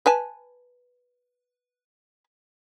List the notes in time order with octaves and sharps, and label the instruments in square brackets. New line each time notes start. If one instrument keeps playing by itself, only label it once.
[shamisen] B4 G#5 A5